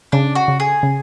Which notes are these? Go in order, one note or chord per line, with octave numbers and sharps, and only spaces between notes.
C#3 D4
F#4
C#3
G#4
C#3